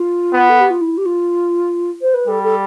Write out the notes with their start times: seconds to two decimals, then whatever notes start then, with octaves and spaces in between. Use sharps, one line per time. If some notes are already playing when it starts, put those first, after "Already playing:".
Already playing: F4
0.33 B3
0.50 A4
0.60 G4
0.70 F4
0.81 E4
0.97 G4
1.06 F4
2.01 C5
2.14 B4
2.28 G3 A4
2.44 A4